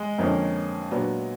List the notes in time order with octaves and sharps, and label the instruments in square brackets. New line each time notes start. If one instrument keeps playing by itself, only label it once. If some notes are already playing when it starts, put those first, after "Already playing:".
Already playing: [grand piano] G#3
[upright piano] F2 D3 F3 A#3 C#4
A#2 F#3 B3 D4